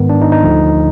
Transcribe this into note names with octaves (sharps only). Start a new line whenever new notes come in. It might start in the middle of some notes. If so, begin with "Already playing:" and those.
Already playing: G#2 D#3 B3
D4
D#4
D#4
D2 D3 F3